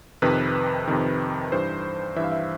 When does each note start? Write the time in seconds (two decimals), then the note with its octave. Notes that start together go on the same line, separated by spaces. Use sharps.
0.22 F2 C3 D#3 B4
0.88 F2 C3 D#3
1.52 G2 E3 C5
2.16 G2 E3 E5
2.24 F5
2.32 E5